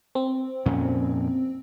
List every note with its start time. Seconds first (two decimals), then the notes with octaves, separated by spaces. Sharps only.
0.15 C4
0.66 F2 A#2 C#4